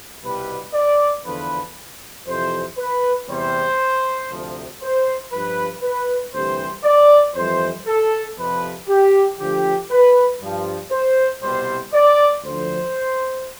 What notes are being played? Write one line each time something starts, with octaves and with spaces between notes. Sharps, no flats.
C2 B2 G3 B4
D5
E2 D3 F3 B4
F2 C3 E3 C5
B4
E2 C3 G3 C5
D2 C3 F3
C5
G2 F3 B4
B4
D2 C3 E3 G3 C5
D5
F2 E3 G3 C5
A4
F2 C3 F3 B4
G4
D2 D3 F3 G4
B4
G2 F3
C5
C2 B2 G3 C5
D5
D2 D3 F3 C5